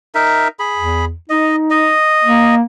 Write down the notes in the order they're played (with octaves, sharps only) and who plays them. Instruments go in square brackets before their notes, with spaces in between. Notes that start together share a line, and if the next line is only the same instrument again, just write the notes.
[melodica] D#4 A#4 E5
G#4 B5
[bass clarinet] E2
[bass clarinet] D#4 [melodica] D#5
[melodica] D#5
[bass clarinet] A#3